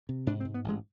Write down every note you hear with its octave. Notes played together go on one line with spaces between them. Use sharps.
C3
G#2 D4
C4
G#2
B3
A1 G#3